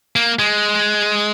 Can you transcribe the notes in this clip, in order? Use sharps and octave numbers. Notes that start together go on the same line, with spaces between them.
A#3
G#3